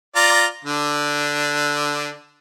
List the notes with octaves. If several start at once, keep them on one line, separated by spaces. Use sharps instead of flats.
F4 D5 A#5
D3 D4